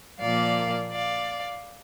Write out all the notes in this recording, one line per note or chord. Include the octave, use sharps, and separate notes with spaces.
A#2 F3 A#3 D5 F5
D5 F5